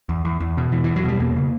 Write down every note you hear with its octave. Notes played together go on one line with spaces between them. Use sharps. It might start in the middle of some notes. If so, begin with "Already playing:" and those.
E2
E2
E2
B2
E2 E3
E2 E3
F#3
B2 G3
E2 A#3
C#3